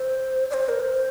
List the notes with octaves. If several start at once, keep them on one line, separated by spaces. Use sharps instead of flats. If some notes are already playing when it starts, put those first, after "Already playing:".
Already playing: C5
D5
C5
A#4
C5